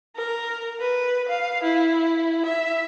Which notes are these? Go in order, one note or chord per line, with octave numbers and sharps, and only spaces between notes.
A#4
B4
F5
E4
E5